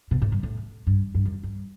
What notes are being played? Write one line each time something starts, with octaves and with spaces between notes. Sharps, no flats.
B2
A2
G2
A2
G2
G2
F#2
G2